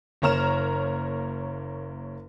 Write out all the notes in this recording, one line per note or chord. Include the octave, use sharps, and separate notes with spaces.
F#1 A#3 C#5 A#5 F6 E7